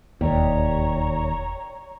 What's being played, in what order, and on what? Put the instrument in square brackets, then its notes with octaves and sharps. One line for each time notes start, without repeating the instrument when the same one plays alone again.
[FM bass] E1 [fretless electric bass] D#2 [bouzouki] G3 [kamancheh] C#5 A#5